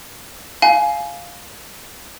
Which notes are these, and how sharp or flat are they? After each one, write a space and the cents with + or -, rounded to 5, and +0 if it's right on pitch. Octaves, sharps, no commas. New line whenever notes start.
F5 +0 G#5 +20